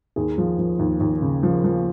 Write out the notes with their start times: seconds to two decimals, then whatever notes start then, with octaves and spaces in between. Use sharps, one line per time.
0.16 D#2 G#4
0.38 F3
0.58 F3
0.79 D#2
1.00 D#2
1.22 C#3
1.43 F3
1.64 F3